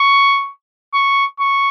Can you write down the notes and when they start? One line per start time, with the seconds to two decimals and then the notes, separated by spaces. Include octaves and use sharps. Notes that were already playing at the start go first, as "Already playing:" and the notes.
Already playing: C#6
0.94 C#6
1.39 C#6